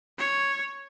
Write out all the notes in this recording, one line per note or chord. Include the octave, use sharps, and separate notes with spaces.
C#5